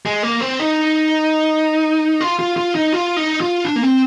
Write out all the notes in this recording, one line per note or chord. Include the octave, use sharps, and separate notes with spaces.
G#3
A#3
C4
D#4
F4
F4
F4
D#4
F4
D#4
F4
D4
A#3
C4